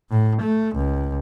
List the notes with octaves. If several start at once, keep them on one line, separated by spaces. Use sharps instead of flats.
A2
A3
C#2